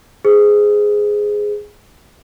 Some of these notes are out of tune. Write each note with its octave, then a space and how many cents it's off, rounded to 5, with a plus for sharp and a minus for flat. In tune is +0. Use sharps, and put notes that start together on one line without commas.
G#4 +0 C5 -20